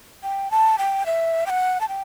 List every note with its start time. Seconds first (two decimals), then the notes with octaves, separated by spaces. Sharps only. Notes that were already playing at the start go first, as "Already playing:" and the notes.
0.23 G5
0.51 A5
0.78 G5
1.06 E5
1.46 G5
1.50 F#5
1.81 A5
1.89 G5